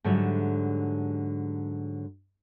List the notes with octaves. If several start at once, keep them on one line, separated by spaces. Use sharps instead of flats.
G#2 D3 F#3 G3 E5